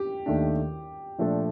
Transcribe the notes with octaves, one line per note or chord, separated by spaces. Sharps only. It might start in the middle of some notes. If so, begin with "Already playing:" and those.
Already playing: G4
D#2 D#3 A3 D4
A#2 F3 A3 D4 A4